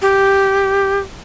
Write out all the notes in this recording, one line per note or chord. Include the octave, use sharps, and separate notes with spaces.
G4